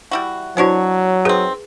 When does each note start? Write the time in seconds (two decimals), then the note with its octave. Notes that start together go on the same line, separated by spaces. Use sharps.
0.11 G3 E4 F#4
0.57 B2 F#3 D4 E4 F#4 C5 C#5
1.25 D#3 C4 G#4 B4